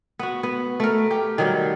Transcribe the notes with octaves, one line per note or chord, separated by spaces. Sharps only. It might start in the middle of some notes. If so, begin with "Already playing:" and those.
B3 F#4
B3
A3 A#4
G4
D#3 F#3 G3